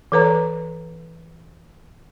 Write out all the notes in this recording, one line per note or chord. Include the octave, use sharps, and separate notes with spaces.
E3 A4 B4 C#5 A#5